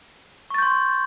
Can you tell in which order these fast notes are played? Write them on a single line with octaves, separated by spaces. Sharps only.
C#6 A6 G6 C6